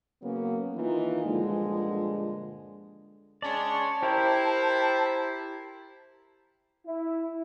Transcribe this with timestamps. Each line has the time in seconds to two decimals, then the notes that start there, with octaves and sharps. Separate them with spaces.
0.22 C#3 F#3 A#3 B3 C#4
0.76 D#3 E3 A#3 D#4 F4
1.25 G2 A#2 D3 F3 G#3
3.42 G#3 C#4 D4 C#5 D5 A5
4.03 E4 G4 A#4 C5
6.87 E4